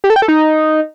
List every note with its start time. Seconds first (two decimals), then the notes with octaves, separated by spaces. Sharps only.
0.04 G4
0.10 A4
0.16 G5
0.22 A4
0.28 D#4